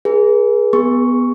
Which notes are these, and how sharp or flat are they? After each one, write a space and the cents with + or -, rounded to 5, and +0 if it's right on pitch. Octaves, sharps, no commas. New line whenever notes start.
G#4 +0 B4 -45
B3 +0 G#4 -20 C#6 +5